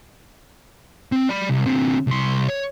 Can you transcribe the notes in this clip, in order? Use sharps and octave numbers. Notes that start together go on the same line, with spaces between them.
C4
D5 B5
C2
D3 C4
C2 C6
C#5